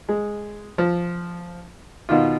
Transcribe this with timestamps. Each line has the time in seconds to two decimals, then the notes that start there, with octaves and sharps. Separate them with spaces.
0.09 G#3
0.78 F3
2.09 B2 D#3 F4